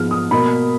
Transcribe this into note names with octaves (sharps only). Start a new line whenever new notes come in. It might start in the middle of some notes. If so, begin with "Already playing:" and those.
Already playing: G#2 F3 G#3 B3 F6
D#6
B2 A#3 B5